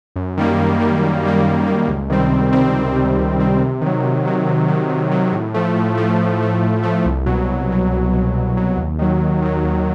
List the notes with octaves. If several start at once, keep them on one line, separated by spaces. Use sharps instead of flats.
F#2
D#3 G3 A#3
F#2
D#3 G3 A#3
F#2
D#3 G3 A#3
F#2
D#3 G3 A#3
C#2
C3 D#3 G3 C4
C#2
C3 D#3 G3 C4
C#2
C3 D#3 G3 C4
C#2
C3 D#3 G3 C4
C3
D#3 F#3
C3
D#3 F#3
C3
D#3 F#3
C3
D#3 F#3
A2
F3 A3
A2
F3 A3
A2
F3 A3
A2
F3 A3
C2
B2 F#3
C2
B2 F#3
C2
B2 F#3
C2
B2 F#3
D#2
D#3 F#3
D#2
D#3 F#3
D#2